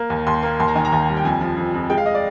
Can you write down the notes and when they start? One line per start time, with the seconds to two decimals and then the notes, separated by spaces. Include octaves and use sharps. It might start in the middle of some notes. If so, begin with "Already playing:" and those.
Already playing: A#3
0.10 D#2
0.27 D#2 C6
0.43 A#3
0.60 D#2 C6
0.68 A#5
0.75 D#3 G#5
0.85 A#5
0.92 D#2
1.08 G3
1.17 G5
1.24 F2 G#5
1.41 F3
1.57 F2
1.74 F2
1.90 G#3 G5
1.98 F5
2.06 D#5
2.15 D5